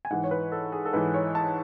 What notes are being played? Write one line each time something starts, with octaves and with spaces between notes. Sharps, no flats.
G#5
G#2 E3 F#5
C#5
B4
A4
G#4
A4
G#2 E3 B4
C#5
A5